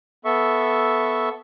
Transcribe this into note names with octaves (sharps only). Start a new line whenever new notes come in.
B3 A4 E5 C#6